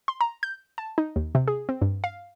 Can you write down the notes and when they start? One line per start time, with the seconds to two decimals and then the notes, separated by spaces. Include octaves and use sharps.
0.08 C6
0.21 A#5
0.43 G6
0.78 A5
0.98 D#4
1.16 D#2
1.35 C3
1.48 G#4
1.69 C4
1.82 G2
2.04 F5